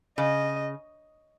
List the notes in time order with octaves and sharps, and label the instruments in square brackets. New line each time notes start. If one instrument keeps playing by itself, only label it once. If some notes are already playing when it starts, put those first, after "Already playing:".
[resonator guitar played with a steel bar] C#3 [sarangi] D#5